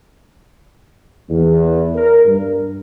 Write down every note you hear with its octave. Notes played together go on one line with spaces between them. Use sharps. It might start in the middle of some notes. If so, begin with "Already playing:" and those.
E2
A#4
G2